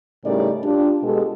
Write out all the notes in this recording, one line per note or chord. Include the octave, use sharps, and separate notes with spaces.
A2 C#3 G3 D#4 A#4 D5
D4 F4 G4
B2 G#3 G4 A4